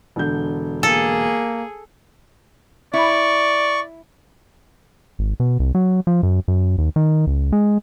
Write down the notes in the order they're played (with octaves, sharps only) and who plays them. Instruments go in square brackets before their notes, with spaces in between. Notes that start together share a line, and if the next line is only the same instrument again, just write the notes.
[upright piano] E1 D3 G6
[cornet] A#3 [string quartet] G#4 [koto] A4
[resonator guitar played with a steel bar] E4 [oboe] D5 [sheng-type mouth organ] C#6
[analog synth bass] G#1
B2
C2
F#3
F3
F#2
F#2
D#2
D#3
C#2
G#3